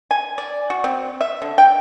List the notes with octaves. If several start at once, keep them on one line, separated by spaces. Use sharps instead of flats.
G#5
D5
F#4
C4
E5
D3
G5